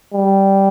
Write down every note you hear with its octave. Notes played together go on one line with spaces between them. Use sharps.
G3